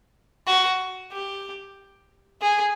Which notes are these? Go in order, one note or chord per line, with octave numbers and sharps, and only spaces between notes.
F#4
G4
G#4